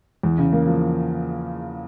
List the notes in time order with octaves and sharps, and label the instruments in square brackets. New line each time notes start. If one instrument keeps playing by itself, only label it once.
[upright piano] E2
C#3
A#3
F3